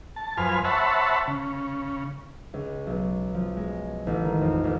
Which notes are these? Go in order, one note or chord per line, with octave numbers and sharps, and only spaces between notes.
A5
F#2 F3 B4 C5 G#5 F6
C5 C#5 E5 F#5 A5 B5
C#3
C#2
B1
F3
G#3
A1
D#3
F2
A1